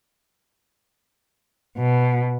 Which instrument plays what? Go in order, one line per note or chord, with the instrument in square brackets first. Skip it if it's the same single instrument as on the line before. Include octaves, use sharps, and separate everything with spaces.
[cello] B2